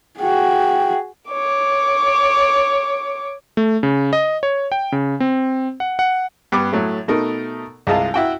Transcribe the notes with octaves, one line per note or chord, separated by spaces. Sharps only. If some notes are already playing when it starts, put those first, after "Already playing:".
F#4 G#4 G5
C#5 D6
A3
C#3
D#5
C#5
G5
C#3
C4
F#5
F#5
G2 B3 D6
A2 F#3 A3
B2 A3 D#4 A#4
C2 G#3 F4 D#5 F5 A5
E4 F#4 G5